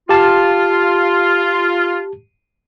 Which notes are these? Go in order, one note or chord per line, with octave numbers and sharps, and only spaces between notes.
F4 G4 A5